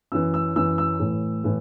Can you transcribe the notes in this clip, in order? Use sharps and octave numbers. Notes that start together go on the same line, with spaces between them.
F#2 E3 E6
E6
F#2 E3 E6
E6
A2 E3
A2 E3